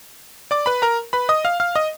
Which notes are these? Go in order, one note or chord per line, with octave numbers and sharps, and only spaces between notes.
D5 D6
B4 B5
A#4 A#5
B4 B5
D#5 D#6
F5 F6
F5 F6
D#5 D#6